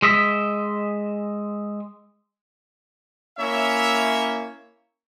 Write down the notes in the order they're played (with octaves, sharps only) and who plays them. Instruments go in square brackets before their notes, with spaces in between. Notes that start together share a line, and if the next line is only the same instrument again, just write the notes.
[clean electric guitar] G#3 D#5 E5
[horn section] A#3 C#4 E4 C#5 E5